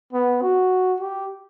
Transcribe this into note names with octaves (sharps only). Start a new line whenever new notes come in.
B3
F#4
G4